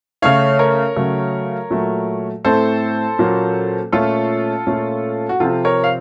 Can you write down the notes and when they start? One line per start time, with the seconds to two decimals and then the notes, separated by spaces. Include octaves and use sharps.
0.22 C#3 A3 C#4 C#5 F5
0.59 A#4 C#5
0.96 C#3 F#3 A3
1.70 A#2 F#3 A3
2.45 A2 A3 C4 A4 C5
3.19 A#2 F#3 A#3 C#4
3.92 A#2 A3 C#4 F4 A4
4.67 A#2 A3 C#4
5.29 F#4
5.40 C3 F3 C4 F4 A4
5.65 A#4 C#5
5.84 F5